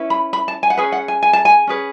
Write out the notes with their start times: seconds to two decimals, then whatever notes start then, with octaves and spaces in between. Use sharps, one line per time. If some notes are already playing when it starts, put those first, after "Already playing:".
Already playing: C#4 E4 B4
0.10 B5
0.33 B5
0.48 A5
0.63 G#5
0.70 F#5
0.77 C#4 G#4 B4 G#5
0.92 F#5
1.08 G#5
1.23 G#5
1.33 A5
1.45 G#5
1.67 C#4 G#4 B4